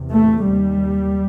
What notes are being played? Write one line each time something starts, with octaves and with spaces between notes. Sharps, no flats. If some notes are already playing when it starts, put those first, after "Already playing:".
Already playing: E2 C3
A3
D#2 G3